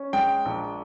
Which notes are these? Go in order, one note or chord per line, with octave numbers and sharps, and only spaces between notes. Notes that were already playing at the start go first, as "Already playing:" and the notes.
Already playing: C#4
G#3 G5
A#1